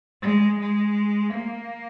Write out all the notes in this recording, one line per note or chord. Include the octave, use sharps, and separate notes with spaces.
G#3
G#3
A#3